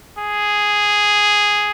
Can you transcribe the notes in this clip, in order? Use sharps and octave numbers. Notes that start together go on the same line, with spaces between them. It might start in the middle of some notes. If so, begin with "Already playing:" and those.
G#4